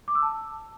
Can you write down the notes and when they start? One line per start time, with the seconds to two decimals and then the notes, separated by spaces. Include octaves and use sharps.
0.08 D6
0.15 E6
0.22 A5